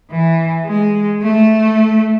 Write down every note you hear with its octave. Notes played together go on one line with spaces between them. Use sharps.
E3
G#3
A3